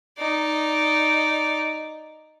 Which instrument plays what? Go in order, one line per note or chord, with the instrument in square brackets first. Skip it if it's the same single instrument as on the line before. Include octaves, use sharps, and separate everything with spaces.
[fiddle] D#4 D5